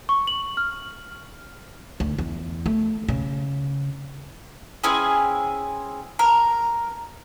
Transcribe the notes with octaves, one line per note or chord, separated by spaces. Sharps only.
C#6
F#7
F6
D2
E2
A3
C#3
C4 C#4 E4 G#4
A#4